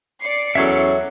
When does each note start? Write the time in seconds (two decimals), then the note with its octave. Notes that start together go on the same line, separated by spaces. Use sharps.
0.22 D5 C7 C#7
0.55 E2 F#3 C#4 A4 C#5 E5